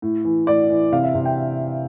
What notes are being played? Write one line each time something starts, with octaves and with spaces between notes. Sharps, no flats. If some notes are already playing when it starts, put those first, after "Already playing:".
A2
E3
A2 D5
E3
C3 F5
E5
C3
G5